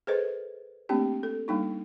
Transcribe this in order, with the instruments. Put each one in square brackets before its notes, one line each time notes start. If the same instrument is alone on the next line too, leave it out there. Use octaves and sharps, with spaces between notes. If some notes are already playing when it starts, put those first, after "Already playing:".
[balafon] G#4 A4 B4 C5 D#5
A3 A#3 C4 D4 G4
A4
G3 A#3 D4 D#4